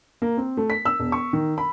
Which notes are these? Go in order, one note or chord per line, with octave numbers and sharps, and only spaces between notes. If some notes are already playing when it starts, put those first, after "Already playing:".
A#3
C4
A3
B6
E6
E1
C#6
D#3
B5